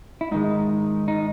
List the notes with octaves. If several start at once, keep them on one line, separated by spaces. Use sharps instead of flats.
E4
G#2 D#3 G#3 D#4
D#4